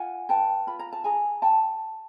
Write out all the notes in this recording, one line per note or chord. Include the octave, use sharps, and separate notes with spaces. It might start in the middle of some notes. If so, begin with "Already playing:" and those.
Already playing: F4 F#5 G#5
B4 G5 A5
F4 B5
A#5
A5
G#4 G#5 A#5
G5 A5